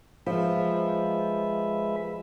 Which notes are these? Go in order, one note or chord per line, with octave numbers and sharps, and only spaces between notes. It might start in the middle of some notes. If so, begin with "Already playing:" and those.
F3 G#3 B4 E5